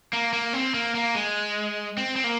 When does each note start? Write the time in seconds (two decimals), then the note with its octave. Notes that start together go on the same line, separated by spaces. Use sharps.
0.13 A#3
0.33 A#3
0.53 C4
0.74 A#3
0.95 A#3
1.15 G#3
1.98 C4
2.16 C4
2.24 A#3